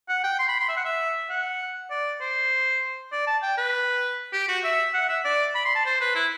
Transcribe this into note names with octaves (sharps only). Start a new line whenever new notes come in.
F#5
G5
C6
B5
C6
E5
F#5
E5
F#5
D5
C5
D5
A5
G5
B4
G4
F#4
E5
F#5
E5
D5
B5
C6
A5
C5
B4
E4